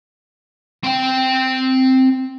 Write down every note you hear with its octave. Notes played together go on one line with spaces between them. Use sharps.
C4 G5